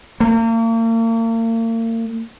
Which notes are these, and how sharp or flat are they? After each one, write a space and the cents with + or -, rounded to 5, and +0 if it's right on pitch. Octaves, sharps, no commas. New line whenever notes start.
A#3 -40